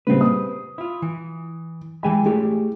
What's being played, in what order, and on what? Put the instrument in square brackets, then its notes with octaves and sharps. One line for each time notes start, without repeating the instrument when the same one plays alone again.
[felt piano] A#2 C#3 G3 [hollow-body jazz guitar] C4 B4
[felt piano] D#6
[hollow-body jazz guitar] E4 F4
E3
[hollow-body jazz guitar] E3 G#5 B5 [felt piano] G#3 G5
[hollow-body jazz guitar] A3 E4 G4 [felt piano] G#4